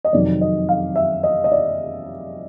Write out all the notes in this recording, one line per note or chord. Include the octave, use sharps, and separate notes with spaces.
D#5
F2 C3 D#3 F#3 D5
D#5
F5
E5
D#5
D#5
D5